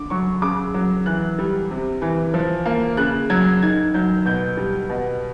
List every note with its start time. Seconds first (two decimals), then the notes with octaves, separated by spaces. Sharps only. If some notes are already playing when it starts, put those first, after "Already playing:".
Already playing: D3 D6
0.10 F#3 C#6
0.42 C#3 D6
0.74 F#3
1.06 E3 F#6
1.39 G3
1.71 C3
2.02 E3
2.34 F3
2.66 A#3
2.97 C#3 F#6
3.30 F#3 G#6
3.63 D#3 G#6
3.94 F#3 G6
4.25 B2 G6
4.57 G3
4.89 B2